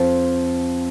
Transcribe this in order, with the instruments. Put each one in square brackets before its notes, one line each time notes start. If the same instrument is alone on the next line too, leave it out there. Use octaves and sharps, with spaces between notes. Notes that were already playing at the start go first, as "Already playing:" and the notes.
Already playing: [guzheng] F2 F3